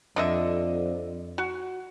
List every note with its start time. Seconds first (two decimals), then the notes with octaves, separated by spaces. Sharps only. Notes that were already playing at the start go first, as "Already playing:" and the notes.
0.16 F2 D3 D#5 E5
1.38 F#4